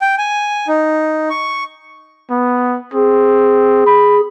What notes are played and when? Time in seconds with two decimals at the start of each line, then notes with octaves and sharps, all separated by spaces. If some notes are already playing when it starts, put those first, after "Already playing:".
0.02 G5
0.18 G#5
0.68 D#4
1.30 C#6
2.31 B3
2.94 C4 G#4
3.87 B5